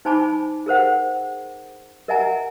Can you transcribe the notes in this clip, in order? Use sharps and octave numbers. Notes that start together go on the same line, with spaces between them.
D#4 C5 G#5 A5 B5 D6
G#4 A#4 C5 F#5
A#4 D#5 E5 F#5 G#5 A#5